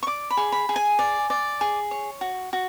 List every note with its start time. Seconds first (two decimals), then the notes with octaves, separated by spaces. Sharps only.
0.03 C#6
0.07 D5 D6
0.31 B5
0.37 G#4
0.52 B5
0.69 G#4
0.76 G#5
0.99 D5
1.30 D5
1.61 G#4
1.91 C#5
2.21 F#4
2.53 F#4